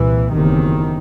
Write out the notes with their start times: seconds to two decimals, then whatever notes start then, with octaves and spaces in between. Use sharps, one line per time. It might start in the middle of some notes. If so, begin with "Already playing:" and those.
Already playing: C2 A#2 E3
0.33 F#1 E2 C3 D#3